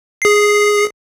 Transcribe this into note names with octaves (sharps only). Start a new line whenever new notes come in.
G#4 C7